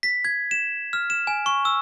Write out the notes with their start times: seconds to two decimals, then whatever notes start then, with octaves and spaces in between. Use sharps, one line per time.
0.03 B6
0.25 G#6
0.51 E7
0.93 F6
1.10 E7
1.27 G#5
1.46 C#6
1.65 E6